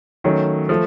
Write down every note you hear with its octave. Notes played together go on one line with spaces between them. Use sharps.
D#3 F#3 A3 C#4
F3 A3